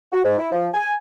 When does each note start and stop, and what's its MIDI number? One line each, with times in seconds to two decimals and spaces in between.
0.12 0.22 66
0.24 0.37 44
0.38 0.49 64
0.52 0.68 53
0.74 0.92 80